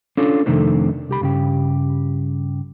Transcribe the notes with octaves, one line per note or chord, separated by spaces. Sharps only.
C#4 D4 F4 A4 C#5
F2 C3 D#3 A3 C4 D4
C2 G4 B5
G2 C#3 G4